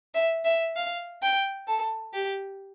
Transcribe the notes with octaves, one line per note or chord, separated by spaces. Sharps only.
E5
E5
F5
G5
A4
G4